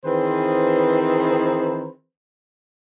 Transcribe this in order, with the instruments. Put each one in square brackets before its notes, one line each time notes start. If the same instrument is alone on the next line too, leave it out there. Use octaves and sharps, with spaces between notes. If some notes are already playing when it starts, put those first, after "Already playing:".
[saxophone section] D#3 E3 C4 G#4 B4 C5